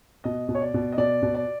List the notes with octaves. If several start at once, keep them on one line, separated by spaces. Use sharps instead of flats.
B2 D#5
B2
C#5
D5
B2
D#5
B2 D5
B2
D5